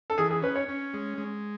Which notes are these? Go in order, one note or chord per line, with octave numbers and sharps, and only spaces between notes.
A4
E3 G#4
G#4
C#4 B4
C#5
C#4
G#3
G#3